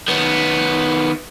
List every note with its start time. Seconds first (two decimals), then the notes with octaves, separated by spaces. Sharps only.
0.08 D#3 B3